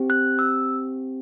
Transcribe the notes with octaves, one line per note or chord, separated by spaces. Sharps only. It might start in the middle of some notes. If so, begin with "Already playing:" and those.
Already playing: C4 G4
F#6
E6